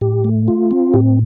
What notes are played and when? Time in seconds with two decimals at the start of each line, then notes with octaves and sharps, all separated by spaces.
0.01 A2 G4
0.24 A3
0.48 F4
0.71 C4
0.94 A2 G4